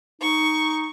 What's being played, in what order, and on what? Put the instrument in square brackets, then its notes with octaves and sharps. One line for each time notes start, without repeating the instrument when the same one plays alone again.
[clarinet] D#4 [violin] C#6